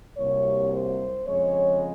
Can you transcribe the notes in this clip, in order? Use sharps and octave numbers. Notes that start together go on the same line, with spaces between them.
C2 C3 F#3 A#3 C#5
C5
F2 C#3 G#3 C#5